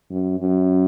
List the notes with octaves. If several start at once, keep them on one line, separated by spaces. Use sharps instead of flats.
F#2
F#2